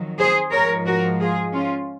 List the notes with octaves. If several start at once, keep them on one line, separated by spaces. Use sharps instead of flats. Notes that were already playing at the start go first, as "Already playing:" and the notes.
Already playing: F2 D#3 F#3
G#4 C5
G#2 F3 G#3 A#4 C#5
F#4 A#4
F4 G#4
C#4 F4